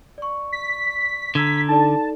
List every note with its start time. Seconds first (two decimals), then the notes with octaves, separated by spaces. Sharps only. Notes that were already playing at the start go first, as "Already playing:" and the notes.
0.18 D5 C#6
0.52 B6
1.35 D3 A#5 E6 G#6
1.69 D#4 A4 D5 A5